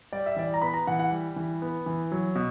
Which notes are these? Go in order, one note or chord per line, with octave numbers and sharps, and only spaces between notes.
G3 D5
E5
E3 D5
A#5
B3 B5
A#5
E3 F#5
F#5
G3
E3
B3
E3
F#3
B2